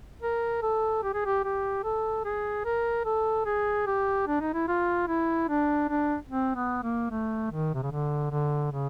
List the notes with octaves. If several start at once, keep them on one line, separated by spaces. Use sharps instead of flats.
A#4
A4
G4
G#4
G4
G4
A4
G#4
A#4
A4
G#4
G4
D4
D#4
E4
F4
E4
D4
D4
C4
B3
A#3
A3
D#3
C3
C#3
D3
D3
C#3